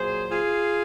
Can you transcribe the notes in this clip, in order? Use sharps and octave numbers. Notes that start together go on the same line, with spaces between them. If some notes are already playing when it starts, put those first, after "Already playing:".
Already playing: A#2 F#3 G#4 C5
F4 G#4